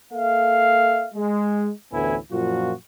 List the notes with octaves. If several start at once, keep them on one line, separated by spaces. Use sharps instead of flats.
A#3 A4 E5 F5
G#3
A1 D2 A2 B3 E4 G#5
F#2 A#2 F3 F4 F#4